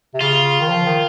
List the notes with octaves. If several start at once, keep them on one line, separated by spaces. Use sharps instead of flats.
C3
C#3 F4
D#3
F3
D#3